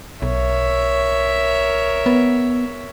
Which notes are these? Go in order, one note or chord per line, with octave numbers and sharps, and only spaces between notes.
B1 A#4 C#5 E5
B3